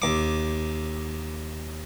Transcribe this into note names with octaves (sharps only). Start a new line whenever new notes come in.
D#2 D6